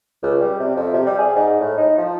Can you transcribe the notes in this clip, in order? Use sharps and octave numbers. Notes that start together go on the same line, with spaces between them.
C#2
G3
C3
F2
C3
G3
G#4
G#2
A2
D#4
F3